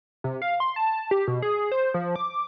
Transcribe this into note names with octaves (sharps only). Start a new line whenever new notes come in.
C3
F5
C6
A5
G4
B2
G#4
C5
F3
D6